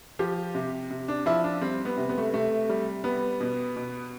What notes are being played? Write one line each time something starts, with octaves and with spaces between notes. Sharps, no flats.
F3 G4
C3
C3
D4
F3 E4
D4
G3 C4
B3
C3
B3
A3
C3 A3
G3
G3 B3
B2
B2